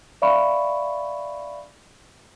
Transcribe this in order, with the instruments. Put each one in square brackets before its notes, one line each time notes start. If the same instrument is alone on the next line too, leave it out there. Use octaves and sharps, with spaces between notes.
[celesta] D5 E5 F5 B5 C#6